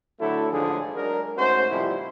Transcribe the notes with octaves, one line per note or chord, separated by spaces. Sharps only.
D3 F#3 A3 E4 A4
A1 G#2 D3 F3 D4 G#4
F#3 G#3 D4 A#4
G#2 A3 C#4 F#4 C5
G#1 C#2 C3 F3 G3 E4